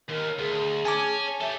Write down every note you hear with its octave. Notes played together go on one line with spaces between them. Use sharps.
D#2 A#4
D2 G#4
C#4 G#5 A5 D6
G4 A4 E5